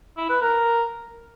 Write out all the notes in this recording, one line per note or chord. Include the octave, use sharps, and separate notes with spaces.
E4
B4
A#4